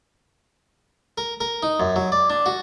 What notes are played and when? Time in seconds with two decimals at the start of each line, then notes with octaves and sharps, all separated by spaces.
1.18 A#4
1.41 A#4
1.63 D#4
1.80 F#2
1.96 F#3
2.12 D5
2.30 D4
2.46 F#4